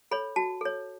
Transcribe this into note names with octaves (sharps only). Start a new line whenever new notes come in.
A4 C#5 B5
F#4 A5
A4 C#5